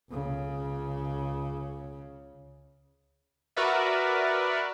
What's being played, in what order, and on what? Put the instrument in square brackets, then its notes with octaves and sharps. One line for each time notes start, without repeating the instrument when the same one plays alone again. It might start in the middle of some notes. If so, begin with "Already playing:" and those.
[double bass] C#2 C#3
[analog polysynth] F#4 A#4 B4 D5 E5